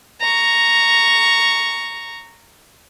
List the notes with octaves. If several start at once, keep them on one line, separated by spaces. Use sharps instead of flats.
A#5 C#6